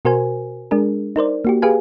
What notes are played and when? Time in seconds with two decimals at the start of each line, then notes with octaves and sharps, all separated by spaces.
0.05 B2 F#4 A#4 C5 G#5
0.71 G#3 D4 G#4 A#4
1.16 D#4 A#4 C5 D5
1.45 A#3 F#4 G4
1.62 G4 G#4 B4 F5 G#5